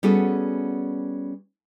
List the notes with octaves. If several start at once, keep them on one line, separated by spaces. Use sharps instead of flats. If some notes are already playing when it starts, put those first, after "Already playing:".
G3 B3 C#4 F#4 G#4 A4